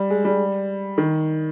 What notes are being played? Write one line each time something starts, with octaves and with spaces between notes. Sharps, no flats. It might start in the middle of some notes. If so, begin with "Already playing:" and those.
Already playing: G3
G#3
G3
D#3